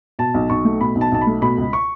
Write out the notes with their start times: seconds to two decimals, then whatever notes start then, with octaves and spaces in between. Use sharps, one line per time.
0.19 B2 A5
0.34 B1
0.50 B1 C#6
0.65 A3
0.80 B2 B5
0.95 B1
1.01 A5
1.12 B1 A5
1.21 B5
1.27 A3
1.41 B2 B5
1.58 C#2
1.73 C#6